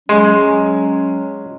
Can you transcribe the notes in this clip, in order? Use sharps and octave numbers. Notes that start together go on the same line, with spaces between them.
F#3 G#3 C#4 C6